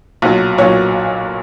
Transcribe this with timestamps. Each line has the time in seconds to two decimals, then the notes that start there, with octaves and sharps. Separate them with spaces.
0.22 B1 A#2 F#3
0.58 B1 A#2 F#3 C#5